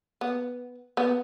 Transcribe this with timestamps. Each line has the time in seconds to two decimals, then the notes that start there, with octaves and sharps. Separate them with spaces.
0.21 B3
0.97 B3